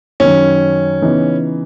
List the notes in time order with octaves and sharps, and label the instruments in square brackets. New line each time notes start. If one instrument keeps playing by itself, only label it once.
[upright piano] F#2 D#3 F#3 [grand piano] C#4
[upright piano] C#3 E3 B3 D#4